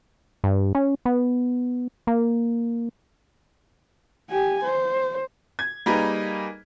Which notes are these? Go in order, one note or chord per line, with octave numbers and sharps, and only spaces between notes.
G2
C#4
B3
A#3
G4 G#5
C5
G#6
G3 A#3 D#4 G#4 A#4 B4